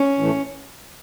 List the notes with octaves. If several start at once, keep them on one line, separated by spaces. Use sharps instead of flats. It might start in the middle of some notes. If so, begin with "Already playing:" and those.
Already playing: C#4
A2 E3 A3